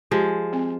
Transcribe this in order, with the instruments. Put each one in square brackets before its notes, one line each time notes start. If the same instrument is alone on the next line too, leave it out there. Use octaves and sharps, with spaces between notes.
[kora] F3 G#3 [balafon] G4
[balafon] C4